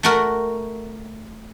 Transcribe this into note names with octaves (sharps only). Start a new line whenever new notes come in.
A3 F#4 A#4